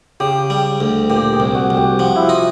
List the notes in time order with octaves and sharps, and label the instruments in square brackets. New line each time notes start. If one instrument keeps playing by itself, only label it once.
[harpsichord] C#3 [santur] G4
[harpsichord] G3
D2
[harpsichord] A#2 [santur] G4
[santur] G#4
[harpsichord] C2
[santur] F#4
[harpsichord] C2
[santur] G4
[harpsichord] F3 [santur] F#4
[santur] E4
F4
[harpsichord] D#4